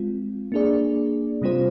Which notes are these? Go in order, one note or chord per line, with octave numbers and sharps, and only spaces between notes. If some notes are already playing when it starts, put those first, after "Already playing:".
Already playing: G#3 C4 F4
A#3 D4 G#4 D5
C3 G3 C4 F4 C5